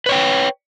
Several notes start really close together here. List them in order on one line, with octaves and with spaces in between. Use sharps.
B4 C#5 G5